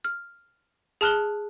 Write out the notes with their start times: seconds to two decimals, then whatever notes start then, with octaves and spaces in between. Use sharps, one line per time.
0.05 F6
1.01 G#4 A5 F6 F#6 G7